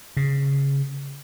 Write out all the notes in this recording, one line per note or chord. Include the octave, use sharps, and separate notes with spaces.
C#3